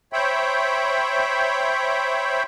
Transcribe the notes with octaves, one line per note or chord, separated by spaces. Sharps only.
C5 C#5 E5 G5 B5